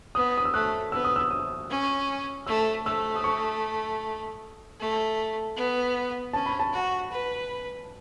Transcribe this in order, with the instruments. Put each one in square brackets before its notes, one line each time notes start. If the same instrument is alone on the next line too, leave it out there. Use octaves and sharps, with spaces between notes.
[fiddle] B3 [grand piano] D#6
[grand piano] D#6
E6
[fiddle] A3 [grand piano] F#6
[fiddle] B3 [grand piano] E6
[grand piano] D#6
E6
D#6
[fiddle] C#4
[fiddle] A3 [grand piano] E6
[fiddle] A3 [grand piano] E6
[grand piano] D#6
C#6
[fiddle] A3
B3
[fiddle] C#4 [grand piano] A5
[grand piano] B5
A5
[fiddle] F#4
B4